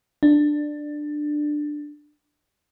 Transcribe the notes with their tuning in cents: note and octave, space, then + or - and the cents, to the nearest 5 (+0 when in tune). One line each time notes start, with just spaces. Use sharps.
D4 +15